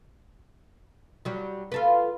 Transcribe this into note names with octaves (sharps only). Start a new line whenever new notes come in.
F#3 G3
F4 A4 B4